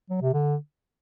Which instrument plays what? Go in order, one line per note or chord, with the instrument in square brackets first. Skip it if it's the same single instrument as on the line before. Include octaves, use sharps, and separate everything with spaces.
[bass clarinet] F#3
C3
D3